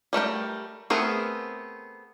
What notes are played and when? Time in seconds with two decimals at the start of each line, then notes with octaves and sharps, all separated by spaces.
0.13 G3 A3 A#4 G5
0.90 A3 B3 C4 G#4 A#4